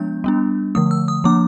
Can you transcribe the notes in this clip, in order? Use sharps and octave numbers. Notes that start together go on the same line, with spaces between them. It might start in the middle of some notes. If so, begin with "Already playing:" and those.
Already playing: F3 G#3 B3 D4 G6
G3 B3 D4
D3 F3 A3 D#6
E6
D#6
F3 A#3 D4 D6